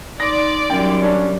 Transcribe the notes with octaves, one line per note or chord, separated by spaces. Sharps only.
D#4 D5 C6 D6 A#6
F#2 G3 G5
C#4 D4